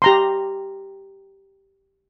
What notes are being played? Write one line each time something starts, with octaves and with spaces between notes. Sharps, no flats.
G4 A#5 C6